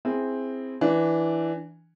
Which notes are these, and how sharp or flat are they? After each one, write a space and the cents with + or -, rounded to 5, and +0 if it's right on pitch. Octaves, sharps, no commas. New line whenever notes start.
C4 +0 E4 +0 G#4 +0
E3 +0 D4 +0